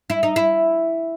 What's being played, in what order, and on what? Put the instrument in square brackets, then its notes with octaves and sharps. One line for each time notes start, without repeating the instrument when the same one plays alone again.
[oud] E4
D#4
E4